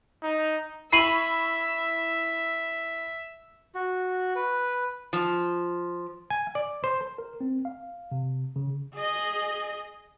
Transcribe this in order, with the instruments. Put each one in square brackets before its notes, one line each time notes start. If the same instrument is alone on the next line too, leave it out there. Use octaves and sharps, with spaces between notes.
[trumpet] D#4
[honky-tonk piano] E4 B5 C#6 [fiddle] E5 [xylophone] C7 D#7 F#7
[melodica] F#4
B4
[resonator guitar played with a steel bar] F3
[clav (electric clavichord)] G#5
D5
C5
[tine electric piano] A#4
C4
F5
C3
C#3
[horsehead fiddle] G#4 D#5